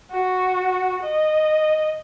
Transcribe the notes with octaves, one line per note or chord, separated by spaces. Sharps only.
F#4
D#5